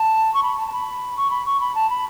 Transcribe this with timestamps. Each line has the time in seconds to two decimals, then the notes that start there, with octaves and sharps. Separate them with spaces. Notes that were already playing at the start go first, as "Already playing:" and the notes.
Already playing: A5
0.33 C#6
0.42 B5
0.57 A5
0.67 A5
0.71 B5
1.16 C#6
1.30 B5
1.45 C#6
1.60 B5
1.75 A5
1.89 B5